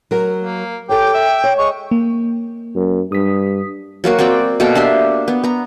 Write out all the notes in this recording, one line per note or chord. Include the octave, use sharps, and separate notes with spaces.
F#3 A#4
A#3
G4 A4 C#5 G5
E5
C#5
G#3 C#6
A#3
F#2
G2 D#6 B6
F#3 A#3 F#4 A#4
C4 F#4 D5 G5
B2 A#3 A4 G5
D4 G4 E5 C6
B3
B3 A#5